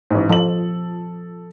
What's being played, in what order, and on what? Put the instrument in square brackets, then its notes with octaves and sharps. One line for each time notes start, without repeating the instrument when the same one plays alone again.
[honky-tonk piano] A1 G#2
[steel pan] F3 [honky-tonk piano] A4 F#7